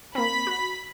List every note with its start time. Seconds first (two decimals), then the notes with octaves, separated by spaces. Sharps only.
0.15 A#3 C4 B5 B6
0.47 F#4